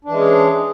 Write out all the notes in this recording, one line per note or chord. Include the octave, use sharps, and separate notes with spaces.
E3 G#3 C#4 D4 G#4